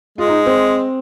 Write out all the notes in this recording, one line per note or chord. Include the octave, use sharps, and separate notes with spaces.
G#3 F4
D#4
C4